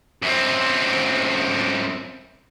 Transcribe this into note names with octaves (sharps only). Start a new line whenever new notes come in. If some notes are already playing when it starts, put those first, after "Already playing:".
F#2 C4